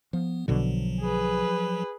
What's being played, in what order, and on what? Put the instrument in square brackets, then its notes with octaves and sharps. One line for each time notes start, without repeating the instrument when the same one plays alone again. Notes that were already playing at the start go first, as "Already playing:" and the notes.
[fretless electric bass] F3 [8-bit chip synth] B3
[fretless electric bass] B1 B2 D3 [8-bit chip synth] F3 F#3
[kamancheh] G#4 B4